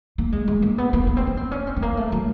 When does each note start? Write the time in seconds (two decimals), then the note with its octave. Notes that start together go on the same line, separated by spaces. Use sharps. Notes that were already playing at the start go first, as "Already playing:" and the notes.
0.18 A#3
0.32 G#3
0.48 G#3
0.62 A#3
0.78 B3
0.93 A#3
1.07 B3
1.17 C4
1.27 C#4
1.37 C4
1.51 C#4
1.67 C4
1.77 A3
1.82 A#3
1.97 A3
2.12 F#3